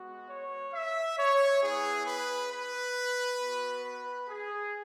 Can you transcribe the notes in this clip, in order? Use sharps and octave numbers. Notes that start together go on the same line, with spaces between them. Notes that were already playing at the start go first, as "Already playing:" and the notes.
Already playing: G#3 B3 F#4
C#5
E5
C#5
B3 E4 G#4
B4
B4
B3 F#4
B4
G#4